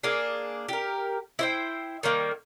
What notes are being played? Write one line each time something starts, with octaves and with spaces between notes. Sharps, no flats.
A#3 D4 G#4
G4 A#4
E4 C5 G5
D#3 G3 A#3